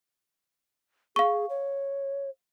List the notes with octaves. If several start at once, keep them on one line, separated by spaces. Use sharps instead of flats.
G#4 F5 C#6
C#5